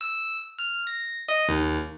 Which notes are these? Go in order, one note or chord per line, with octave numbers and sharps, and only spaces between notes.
E6
F6
A#6
D#5
D#2